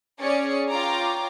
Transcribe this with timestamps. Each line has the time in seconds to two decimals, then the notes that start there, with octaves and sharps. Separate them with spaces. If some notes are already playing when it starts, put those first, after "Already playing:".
0.20 C#4 G#4 D5 G#5 C#7
0.70 F4 C#5 G5 A#5 D6